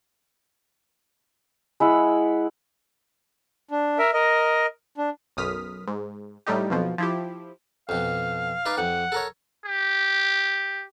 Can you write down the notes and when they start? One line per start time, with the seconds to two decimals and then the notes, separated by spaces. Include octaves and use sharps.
1.80 G#3 E4 F#5 E6
3.71 D4
3.99 A#4 E5
4.14 A#4 D#5
4.98 D4
5.37 B1 F#2 D#6 F6 B6
5.87 G#2
6.46 A2 G3 A3 D#4 G4
6.70 B1 F2 B2 F3
6.98 F3 E4 G4
7.89 F2 B2 F5
8.65 D#4 B4 D5
8.78 F2 F#5
9.12 A4 A#4 C#5
9.65 G4